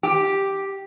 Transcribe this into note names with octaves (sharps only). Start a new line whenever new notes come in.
G4